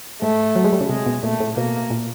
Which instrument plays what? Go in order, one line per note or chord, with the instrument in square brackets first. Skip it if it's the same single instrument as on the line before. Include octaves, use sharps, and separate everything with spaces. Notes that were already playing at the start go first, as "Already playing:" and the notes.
[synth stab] G#2 [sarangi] A3
[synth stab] F#3
G#3
G3
C#3
[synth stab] C3 [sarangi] G#3
[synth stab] B2
[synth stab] A#2 [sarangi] A3
[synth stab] A2
[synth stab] B2 [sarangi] A#3
[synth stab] A#2